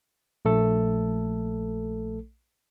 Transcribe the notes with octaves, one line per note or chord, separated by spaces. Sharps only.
A#1 A3 A4